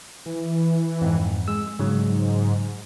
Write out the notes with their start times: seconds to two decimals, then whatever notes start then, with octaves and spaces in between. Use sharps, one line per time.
0.26 E3
1.02 F2 G#2
1.48 G#3 E6
1.79 G#2 C#3 F#3